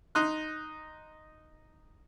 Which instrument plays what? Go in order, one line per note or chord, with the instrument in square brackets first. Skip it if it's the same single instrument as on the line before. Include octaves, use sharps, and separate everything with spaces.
[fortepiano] D#4 C6 F#6